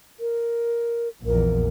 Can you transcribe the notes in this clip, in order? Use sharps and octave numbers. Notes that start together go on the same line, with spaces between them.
A#4
A#1 E2 A#4